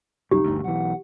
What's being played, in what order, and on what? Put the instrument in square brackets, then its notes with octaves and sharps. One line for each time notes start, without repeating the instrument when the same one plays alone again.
[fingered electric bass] C2 F#2 [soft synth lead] D#4 [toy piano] G4
[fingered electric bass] G1 D2
[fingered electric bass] B1 E3 [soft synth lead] F#5